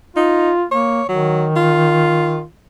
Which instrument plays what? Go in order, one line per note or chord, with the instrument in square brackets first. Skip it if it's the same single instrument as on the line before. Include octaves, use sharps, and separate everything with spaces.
[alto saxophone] D#4 [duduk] F4
[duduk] A#3 [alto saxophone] C#5
[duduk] D#3 [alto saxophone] F#3
[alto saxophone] F4